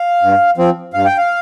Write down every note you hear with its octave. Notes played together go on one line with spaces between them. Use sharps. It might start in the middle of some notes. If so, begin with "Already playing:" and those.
Already playing: F5
G2
F3 C4
G2 F5
G5
F5